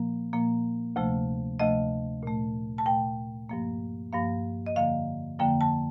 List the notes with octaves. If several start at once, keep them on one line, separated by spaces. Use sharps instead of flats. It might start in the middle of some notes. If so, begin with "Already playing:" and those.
Already playing: A#2 F3 A#3
A#2 F3 A#3
D2 C3 F3 A3
D2 C3 F3 A3 D#5
A#2 A3
A5
A#2 A3 G5
G2 F3 A#3
G2 F3 A#3 F5
D#5
F2 D3 F3 A#3 F5
F2 D3 F3 A#3 G5
A5